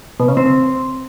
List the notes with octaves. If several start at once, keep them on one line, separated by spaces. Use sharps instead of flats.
B2
C#3
C4